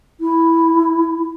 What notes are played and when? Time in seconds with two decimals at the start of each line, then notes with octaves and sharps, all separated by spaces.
0.21 E4